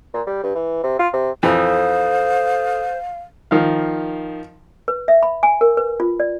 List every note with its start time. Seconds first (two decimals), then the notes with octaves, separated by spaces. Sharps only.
0.14 A#2
0.27 G3
0.44 G2
0.55 E3
0.83 C3
0.99 F4
1.13 C3
1.43 F2 E3 A4 C5 F5 D#6
3.51 D#3 F3 F5
4.88 B4
5.08 E5
5.23 B5
5.43 G#5
5.61 A#4
5.77 B4
6.00 F4
6.20 D5